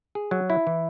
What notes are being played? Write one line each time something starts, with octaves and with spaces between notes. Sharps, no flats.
G#4
F#3
E4
E3